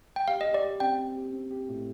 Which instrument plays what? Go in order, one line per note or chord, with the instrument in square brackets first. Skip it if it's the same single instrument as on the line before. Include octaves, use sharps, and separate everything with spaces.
[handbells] G5
[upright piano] G4 [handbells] F5
[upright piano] G4 [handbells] D#5
[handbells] D5
[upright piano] G4
[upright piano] C4 [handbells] G5
[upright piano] C4
G4
C4
G4
A2